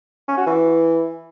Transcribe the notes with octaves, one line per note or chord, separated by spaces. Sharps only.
C#4
F#4
E3